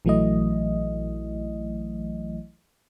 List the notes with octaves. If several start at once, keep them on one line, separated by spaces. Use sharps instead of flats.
A#1 E3 F#3 A3 E4 D#5